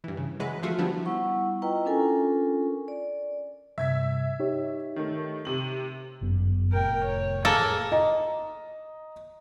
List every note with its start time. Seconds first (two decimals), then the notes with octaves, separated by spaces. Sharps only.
0.04 G2 E3
0.17 C#3
0.40 E3 F#3 G#3 B4
0.62 D3 F3 A3 F4 F#4
0.78 F3 G3 B3 D4 E4
1.05 G3 B3 E4 F#5 C#6
1.62 E4 F4 B4 D#5 G5 A#5
1.85 C#4 D4 F4 A4 A#4 G#5
2.88 D5
3.78 G2 C3 E5 G#6 B6
4.40 D#4 G4 C#5
4.96 D#3 A3
5.45 C3 F#7
6.21 G1 F#2 B3
6.72 F1 A2 B3 A#4 G5
7.04 C#5
7.45 A#3 G#4 A4
7.92 D#5 A#5